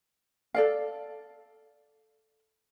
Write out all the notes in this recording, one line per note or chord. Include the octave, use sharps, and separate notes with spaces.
A4 D5 F5